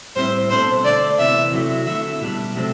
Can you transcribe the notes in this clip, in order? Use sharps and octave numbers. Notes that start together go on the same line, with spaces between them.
A2 G3 C4 E4 C5
B2 A3 D4 C5
D3 A3 D4 D5
C3 E3 B3 E4 E5
C3 F#3 A3 E4
D3 A3 E4 E5
B2 G3 D4
C3 F#3 A3 C4